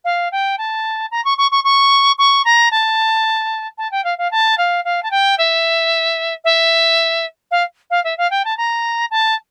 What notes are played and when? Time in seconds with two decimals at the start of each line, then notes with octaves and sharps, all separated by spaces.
0.04 F5
0.32 G5
0.58 A5
1.11 A#5
1.25 C#6
1.38 C#6
1.51 C#6
1.64 C#6
2.18 C#6
2.45 A#5
2.71 A5
3.78 A5
3.91 G5
4.04 F5
4.18 F5
4.31 A5
4.58 F5
4.85 F5
5.03 A5
5.11 G5
5.38 E5
6.44 E5
7.51 F5
7.90 F5
8.04 E5
8.18 F5
8.31 G5
8.45 A5
8.57 A#5
9.11 A5